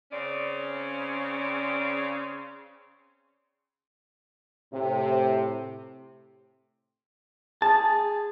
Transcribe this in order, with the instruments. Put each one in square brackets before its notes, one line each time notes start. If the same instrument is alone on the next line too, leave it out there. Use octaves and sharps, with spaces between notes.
[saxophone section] C#3 C4 C#4 [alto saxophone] D5
[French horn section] A2 C3
[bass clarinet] G#4 [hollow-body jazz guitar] A5